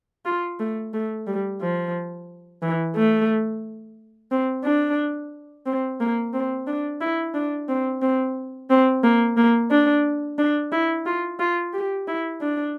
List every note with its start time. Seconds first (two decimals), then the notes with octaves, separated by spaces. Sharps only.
0.25 F4
0.60 A3
0.94 A3
1.27 G3
1.61 F3
2.62 E3
2.96 A3
4.31 C4
4.64 D4
5.66 C4
6.00 A#3
6.33 C4
6.67 D4
7.01 E4
7.34 D4
7.69 C4
8.02 C4
8.70 C4
9.03 A#3
9.37 A#3
9.71 D4
10.38 D4
10.72 E4
11.06 F4
11.39 F4
11.73 G4
12.08 E4
12.41 D4